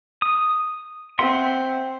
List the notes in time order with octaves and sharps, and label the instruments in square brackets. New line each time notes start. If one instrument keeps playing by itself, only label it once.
[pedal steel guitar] D#6
[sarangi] C4 [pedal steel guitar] E5 F#5 C6